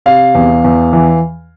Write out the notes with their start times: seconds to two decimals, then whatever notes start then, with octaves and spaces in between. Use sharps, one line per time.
0.06 C3 F5
0.35 E2
0.64 E2
0.93 E3